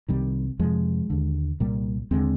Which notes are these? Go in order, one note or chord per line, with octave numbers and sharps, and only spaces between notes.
C2 C3 D#3 G3
F2 C3 F3 G#3
D#2 D3
C2 A#2 G3 A#3
D#2 D3 G#3 C4